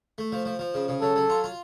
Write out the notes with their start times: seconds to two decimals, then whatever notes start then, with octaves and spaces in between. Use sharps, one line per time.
0.18 A3
0.32 F3
0.45 F3
0.59 F3
0.74 C#3
0.88 C#3
1.02 F#3 A4
1.16 F#3
1.30 F4
1.44 F4